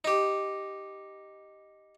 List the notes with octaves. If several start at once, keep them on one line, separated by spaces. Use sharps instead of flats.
D#4 G4